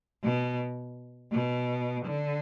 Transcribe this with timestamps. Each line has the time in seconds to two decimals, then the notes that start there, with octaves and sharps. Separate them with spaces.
0.23 B2
1.32 B2
2.05 D3